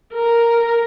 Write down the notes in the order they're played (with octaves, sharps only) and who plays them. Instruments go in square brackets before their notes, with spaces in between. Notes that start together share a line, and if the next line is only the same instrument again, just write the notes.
[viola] A#4